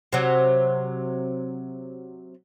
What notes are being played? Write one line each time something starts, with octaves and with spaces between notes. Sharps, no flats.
C3 F#3